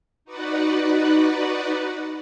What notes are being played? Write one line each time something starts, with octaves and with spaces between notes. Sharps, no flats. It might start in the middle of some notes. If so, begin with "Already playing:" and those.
D#4 F#4 B4 D5 F#5